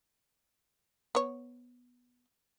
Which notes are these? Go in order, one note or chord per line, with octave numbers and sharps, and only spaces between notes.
B3 C#5